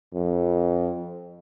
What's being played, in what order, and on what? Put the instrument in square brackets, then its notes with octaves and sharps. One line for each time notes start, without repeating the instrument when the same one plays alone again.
[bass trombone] F2